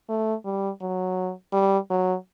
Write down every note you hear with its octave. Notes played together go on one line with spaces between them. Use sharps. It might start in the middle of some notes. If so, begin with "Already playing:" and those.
A3
G3
F#3
G3
F#3